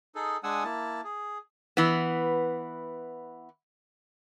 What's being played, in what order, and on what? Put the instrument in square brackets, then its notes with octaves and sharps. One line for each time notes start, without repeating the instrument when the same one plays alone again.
[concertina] D#4 G#4 A4
G#3 D4 F#5 G#5 D#6 E6
A#3 E4 A5
G#4
[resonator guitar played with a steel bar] E3 B3